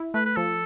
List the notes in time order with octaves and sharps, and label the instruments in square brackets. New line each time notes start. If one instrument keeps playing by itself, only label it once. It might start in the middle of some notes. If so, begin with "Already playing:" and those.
Already playing: [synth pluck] E4
[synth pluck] A3 [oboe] B4
[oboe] B4
[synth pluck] F3 [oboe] A4